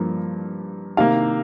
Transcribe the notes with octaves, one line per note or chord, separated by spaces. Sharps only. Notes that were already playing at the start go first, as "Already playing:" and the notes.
Already playing: G2 F3 A#3
C3 D#3 A#3 F5